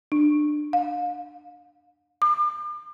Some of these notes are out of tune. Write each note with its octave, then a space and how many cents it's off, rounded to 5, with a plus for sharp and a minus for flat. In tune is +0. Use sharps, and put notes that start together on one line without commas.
D4 +25
F5 +35
D6 +45